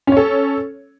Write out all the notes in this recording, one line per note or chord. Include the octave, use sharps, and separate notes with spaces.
C#4 A4 C#5